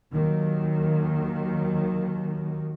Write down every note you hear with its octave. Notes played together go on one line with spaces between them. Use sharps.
D#2 D#3 F#3